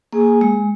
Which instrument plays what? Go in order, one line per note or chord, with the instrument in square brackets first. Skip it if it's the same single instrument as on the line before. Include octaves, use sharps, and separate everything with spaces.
[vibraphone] A#3 [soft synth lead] G#4
[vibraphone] G#3